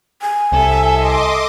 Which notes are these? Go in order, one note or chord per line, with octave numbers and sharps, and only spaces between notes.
G#5
C2 A4 E5
D#5 C6 D6